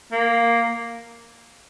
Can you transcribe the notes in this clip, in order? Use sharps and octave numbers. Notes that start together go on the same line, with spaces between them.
A#3